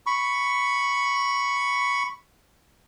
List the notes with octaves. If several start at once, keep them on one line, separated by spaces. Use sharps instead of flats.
B5 C#6